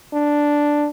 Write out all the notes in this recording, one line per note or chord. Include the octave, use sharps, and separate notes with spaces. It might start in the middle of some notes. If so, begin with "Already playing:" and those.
D4